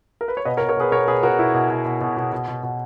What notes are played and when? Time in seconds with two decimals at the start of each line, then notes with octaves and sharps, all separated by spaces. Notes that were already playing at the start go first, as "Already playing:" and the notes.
0.21 A#4
0.28 B4
0.37 C#5
0.45 B2 B4 D#5
0.57 A#4 C#5
0.61 B2
0.69 A#4 C#5
0.77 B2 G#4 B4
0.92 B2 A#4 C#5
1.07 B2 G#4 B4
1.23 B2 F#4 A#4
1.39 B2 E4
1.54 B2
1.70 B2
1.85 B2
2.01 B2
2.17 B2
2.32 B2
2.48 B2
2.63 B2